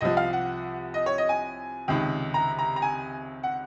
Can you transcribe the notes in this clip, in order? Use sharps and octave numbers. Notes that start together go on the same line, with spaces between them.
C2 C3 F3 D#5
F5
F#5
D#5
C#5
D#5
G#5
C#2 C3 D#3
A#5
A#5
A#5
G#5
F#5